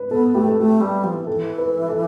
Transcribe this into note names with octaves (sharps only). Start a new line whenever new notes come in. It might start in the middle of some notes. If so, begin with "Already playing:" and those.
Already playing: B4
B3 A4
A3 G4
A4
A3 G4
G3
F3
E3
A4
E3
B4
A4